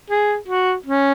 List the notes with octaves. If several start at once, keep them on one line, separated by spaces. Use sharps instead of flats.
G#4
F#4
C#4